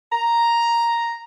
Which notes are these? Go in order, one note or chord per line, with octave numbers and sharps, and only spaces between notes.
A#5